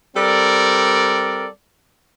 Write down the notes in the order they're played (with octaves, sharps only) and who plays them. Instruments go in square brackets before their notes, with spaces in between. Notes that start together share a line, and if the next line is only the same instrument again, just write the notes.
[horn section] G3 C4 A4 A#4 D5